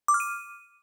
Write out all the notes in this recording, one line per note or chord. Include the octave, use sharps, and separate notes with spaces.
D6
F6
D#7